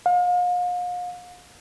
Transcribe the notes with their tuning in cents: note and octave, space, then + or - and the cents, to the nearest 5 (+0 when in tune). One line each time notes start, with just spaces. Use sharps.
F5 +40